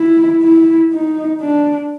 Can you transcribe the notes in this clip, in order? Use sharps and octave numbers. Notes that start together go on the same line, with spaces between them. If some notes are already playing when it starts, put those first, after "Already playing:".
Already playing: E4
E4
D#4
D4